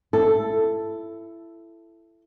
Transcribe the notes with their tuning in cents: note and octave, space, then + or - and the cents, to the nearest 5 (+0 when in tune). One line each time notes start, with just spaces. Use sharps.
E4 +20 A4 +0